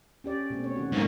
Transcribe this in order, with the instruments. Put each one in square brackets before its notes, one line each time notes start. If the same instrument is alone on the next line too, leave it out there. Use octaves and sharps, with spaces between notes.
[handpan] C#4 G4 D5
B2 A3 C4
C#5
D#3 C#4 F#4
[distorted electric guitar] G#2 A#3 [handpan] A3